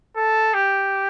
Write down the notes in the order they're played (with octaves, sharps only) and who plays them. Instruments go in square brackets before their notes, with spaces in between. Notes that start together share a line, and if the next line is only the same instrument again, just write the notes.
[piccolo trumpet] A4
G4